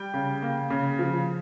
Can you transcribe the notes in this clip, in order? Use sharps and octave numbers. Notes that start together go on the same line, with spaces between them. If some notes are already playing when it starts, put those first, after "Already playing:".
Already playing: G3 G5
C#3
A#3
C#3
F3